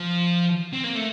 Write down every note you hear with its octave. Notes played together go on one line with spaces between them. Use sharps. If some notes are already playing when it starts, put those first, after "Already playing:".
Already playing: F3
C4
A#3
A3